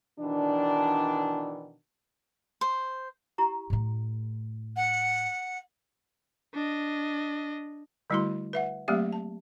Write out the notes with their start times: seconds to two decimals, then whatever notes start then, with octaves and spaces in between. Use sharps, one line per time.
0.19 B2 D#3 E3 D4
2.61 C5
3.38 E4 G4 A#5
3.70 A2 A3
4.76 F#5
6.54 D4 D#5
8.10 D3 G3 A3 E4 F#4 C6
8.53 B4 E5 F#5
8.88 F#3 A3 A#3 C4 G4 E5
9.13 A5